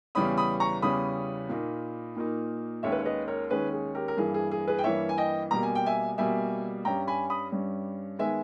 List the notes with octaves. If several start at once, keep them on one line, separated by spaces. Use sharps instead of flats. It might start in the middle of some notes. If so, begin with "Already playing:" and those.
E2 C#3 E3 G3 C#4 B5 D#6
B5 D#6
A#5 C#6
E2 C#3 E3 G3 C#4 B5 D#6
A#2 A#3 D#4
A#2 A#3 D#4
D#2 D#3 G#3 C#4 C#5 E5
B4
C#5
B4 D#5
A#4 C#5
D#2 D#3 G#3 C#4 G#4 B4
G#4
G4 A#4
A#4
G2 E3 A#3 G#4
G#4
G#4
G#4 B4
G5
G2 E3 A#3 C#5 E5
G#5
D#5 G5
B2 G3 A#3 A#5
G#5
G5
E5 G#5
B2 G3 A#3 E5 G#5
G2 G3 C#4 G5 A#5
G#5 B5
B5 D#6
G2 G3 C#4
D#3 G#3 B3 E5 G#5